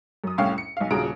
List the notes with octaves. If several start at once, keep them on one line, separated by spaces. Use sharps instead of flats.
F#2 D#6
C2 A2 C#4 F5 G5 C#6
C#7
B1 F5
D#1 C#3 F4 F#4 A#5 D7